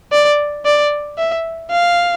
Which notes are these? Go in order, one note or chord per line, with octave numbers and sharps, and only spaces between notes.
D5
D5
E5
F5